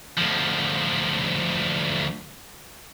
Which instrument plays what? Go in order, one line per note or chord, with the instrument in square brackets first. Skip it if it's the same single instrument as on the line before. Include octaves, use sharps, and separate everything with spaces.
[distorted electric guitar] D2 F3